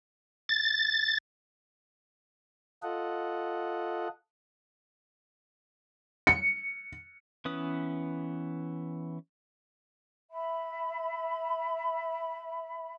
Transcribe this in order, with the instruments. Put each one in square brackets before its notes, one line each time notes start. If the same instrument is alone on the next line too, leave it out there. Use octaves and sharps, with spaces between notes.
[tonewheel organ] A6
[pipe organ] F4 A4 D#5 F#5
[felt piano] C#7
[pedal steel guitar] E3 B3 C#4 B4 D#6
[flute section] E5 B5